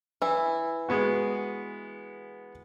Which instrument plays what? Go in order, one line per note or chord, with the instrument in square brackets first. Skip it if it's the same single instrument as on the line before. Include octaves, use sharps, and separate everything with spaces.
[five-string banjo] E3 E4
[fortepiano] G#3 B3 F#4